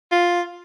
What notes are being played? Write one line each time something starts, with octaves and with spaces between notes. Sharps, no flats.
F4